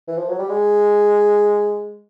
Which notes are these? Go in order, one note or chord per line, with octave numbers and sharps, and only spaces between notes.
E3
F3
F#3
G3
G#3